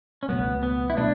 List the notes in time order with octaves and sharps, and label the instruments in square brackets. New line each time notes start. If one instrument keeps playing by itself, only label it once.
[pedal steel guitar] C#4
[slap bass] C#2 B2 F#3 A3 [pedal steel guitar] B3
[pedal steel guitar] B3
E4
[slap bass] B2 F#3 A3 [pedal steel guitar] D4